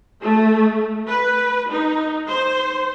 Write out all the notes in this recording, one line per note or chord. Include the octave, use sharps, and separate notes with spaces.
A3
B4
D#4
C5